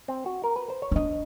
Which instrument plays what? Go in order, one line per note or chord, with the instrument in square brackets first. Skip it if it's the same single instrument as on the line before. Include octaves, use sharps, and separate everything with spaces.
[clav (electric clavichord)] C4
F#4
A#4
B4
C5
C#5
[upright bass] C#4
[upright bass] D4 [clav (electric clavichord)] D#5